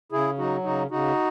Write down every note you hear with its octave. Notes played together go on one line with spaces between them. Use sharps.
C#3 E4 G#4
F#3 D#4 F#4
C#3 D#4 F#4
C#3 D#4 F#4